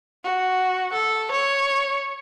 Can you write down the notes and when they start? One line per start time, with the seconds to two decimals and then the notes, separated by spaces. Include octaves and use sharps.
0.24 F#4
0.93 A4
1.31 C#5